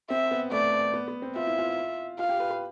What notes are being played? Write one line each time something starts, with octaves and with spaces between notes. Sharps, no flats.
C4 E5
B3
A3 D5
B3
B3
C4
F4 E5
E4
F4
F4 F5
G4
B4
B4